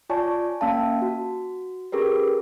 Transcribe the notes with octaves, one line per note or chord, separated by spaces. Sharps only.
F4 C#5 D5 G#5 A5 C#6
A#3 C#4 F5 A5
F#4
C#4 G4 G#4 A#4 B4